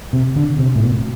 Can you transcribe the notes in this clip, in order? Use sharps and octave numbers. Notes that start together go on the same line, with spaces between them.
C3
D3
C3
A2
B2